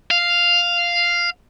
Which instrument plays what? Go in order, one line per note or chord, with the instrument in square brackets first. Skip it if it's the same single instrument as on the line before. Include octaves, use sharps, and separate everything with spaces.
[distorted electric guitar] F5